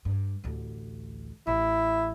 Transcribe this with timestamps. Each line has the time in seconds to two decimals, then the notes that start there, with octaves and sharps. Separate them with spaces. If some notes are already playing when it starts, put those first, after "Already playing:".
0.05 G2
0.44 A1 D2
1.47 A1 E4